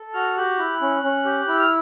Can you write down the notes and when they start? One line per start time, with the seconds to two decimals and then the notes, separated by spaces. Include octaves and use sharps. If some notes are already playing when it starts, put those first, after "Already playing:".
Already playing: A4
0.14 F#4 F6
0.37 G4 F#6
0.58 E4
0.81 C#4
1.03 C#4
1.25 G4
1.48 E4
1.59 F6